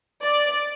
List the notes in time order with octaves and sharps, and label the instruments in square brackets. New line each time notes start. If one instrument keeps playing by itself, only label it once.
[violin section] D5